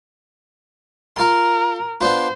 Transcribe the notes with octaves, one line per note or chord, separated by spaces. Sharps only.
F4 A#4 C6
B3 D4 F4 C5